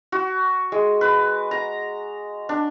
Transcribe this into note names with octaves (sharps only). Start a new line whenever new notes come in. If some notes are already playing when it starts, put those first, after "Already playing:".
F#4
G#3
B4
A#5
D4